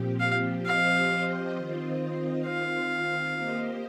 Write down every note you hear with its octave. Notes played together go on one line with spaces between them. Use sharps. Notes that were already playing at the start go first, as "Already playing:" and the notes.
Already playing: A#2 F3 C4 G4
F5
F3 C4 G4 C5 D#5 F5
D#3 C4 F4 C5 D#5
D#3 C4 F4 F5
A#3 G4 C5 D#5